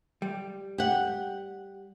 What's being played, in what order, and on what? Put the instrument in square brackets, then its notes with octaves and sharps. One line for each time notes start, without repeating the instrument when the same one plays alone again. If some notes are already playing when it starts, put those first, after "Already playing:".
[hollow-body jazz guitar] G3
[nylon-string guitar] G4 F#5